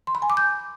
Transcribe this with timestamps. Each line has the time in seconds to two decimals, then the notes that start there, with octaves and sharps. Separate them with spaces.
0.07 C6
0.15 B5
0.22 G#5
0.30 D6
0.37 G6